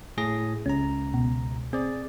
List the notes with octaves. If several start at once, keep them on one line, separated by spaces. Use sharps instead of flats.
A2 G#4 A#6
C#2 C#4 A#5
B2
C4 G#4 D5